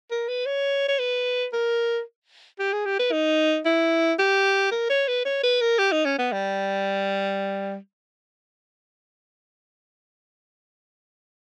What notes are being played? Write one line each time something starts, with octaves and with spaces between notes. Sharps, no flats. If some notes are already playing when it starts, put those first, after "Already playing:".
A#4
B4
C#5
C#5
B4
A#4
G4
G#4
G4
B4
D#4
E4
G4
A#4
C#5
B4
C#5
B4
A#4
G4
D#4
C#4
B3
G3